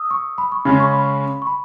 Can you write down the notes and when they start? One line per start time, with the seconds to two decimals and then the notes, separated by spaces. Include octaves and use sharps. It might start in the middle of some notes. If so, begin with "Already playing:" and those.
Already playing: D#6 E6
0.11 C#6
0.38 B5
0.52 C#6
0.65 C#3 G#3 C#4 B5
0.80 C#6
0.94 B5
1.42 C#6
1.47 B5